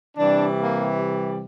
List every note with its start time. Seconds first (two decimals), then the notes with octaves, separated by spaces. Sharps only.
0.16 C3 E3 G3 D4
0.59 A#3